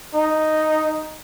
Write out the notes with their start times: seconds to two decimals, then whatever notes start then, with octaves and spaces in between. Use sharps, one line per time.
0.15 D#4